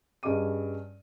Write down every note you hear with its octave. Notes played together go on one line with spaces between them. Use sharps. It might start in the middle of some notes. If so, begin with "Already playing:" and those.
G2 C#4 G#4 D#5 D6 D#7